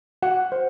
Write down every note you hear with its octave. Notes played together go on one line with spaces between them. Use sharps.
F#4 F#5
C5